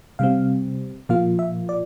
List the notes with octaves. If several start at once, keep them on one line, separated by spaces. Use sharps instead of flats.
C3 G3 C4 F5
A#2 F3 A#3 F4 F5
E5
D5